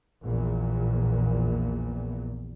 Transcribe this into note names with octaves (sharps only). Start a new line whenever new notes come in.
A#1 E2 A#2